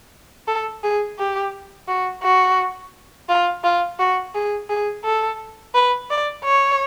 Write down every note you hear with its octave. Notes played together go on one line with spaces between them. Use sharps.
A4
G#4
G4
F#4
F#4
F4
F4
F#4
G#4
G#4
A4
B4
D5
C#5